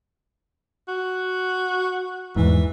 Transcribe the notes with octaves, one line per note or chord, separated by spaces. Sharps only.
F#4
E2 G#2 E3